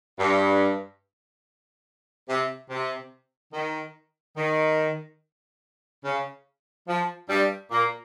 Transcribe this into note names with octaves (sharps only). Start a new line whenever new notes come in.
G2
C3
C3
D#3
D#3
C#3
F3
G2 G3
A#2 A#3